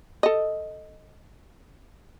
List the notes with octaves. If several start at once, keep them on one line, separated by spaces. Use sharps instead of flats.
A4 D#5